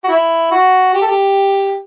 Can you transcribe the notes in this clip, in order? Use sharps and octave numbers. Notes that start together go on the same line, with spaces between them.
F#4
E4
F#4
G4
A4
G4